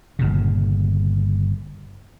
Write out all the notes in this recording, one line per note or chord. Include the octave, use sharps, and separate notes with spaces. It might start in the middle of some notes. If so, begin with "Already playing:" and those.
G1 A#2 C#3